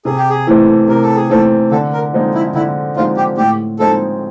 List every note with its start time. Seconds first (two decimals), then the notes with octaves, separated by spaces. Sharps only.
0.05 C3 G#4
0.17 G4
0.29 G#4
0.47 E3 A3 C4
0.88 C3 A#4
1.02 A4
1.15 G#4
1.30 E3 A3 C4 A4
1.71 D3 A4
1.93 A#4
2.13 F3 G#3 C4 D#4
2.34 E4
2.55 D3 E4
2.96 F3 G#3 C4 D#4 F4
3.17 G4
3.37 A2 G4
3.79 F3 G#3 C4 D#4 A4